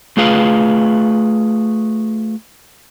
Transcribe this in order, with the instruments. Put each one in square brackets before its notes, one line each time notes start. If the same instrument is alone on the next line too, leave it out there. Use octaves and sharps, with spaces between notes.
[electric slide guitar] A3 F4 G#4 B4 F5